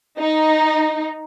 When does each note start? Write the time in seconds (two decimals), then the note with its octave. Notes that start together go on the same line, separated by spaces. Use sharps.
0.18 D#4